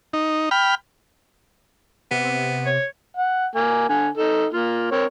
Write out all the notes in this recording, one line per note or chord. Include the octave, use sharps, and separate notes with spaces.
D#4
G5 B5 F6
C3 B3
C#5
F#5
A#3 G#5
D3 G#5
D#4 A4
A#3 F4
C4 A#4 C#5